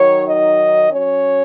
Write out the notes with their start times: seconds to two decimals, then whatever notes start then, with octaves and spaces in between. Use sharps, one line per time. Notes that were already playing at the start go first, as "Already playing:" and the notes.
Already playing: D#3 F#3 D#4 C#5
0.28 D#5
0.91 F#3 C#4 C#5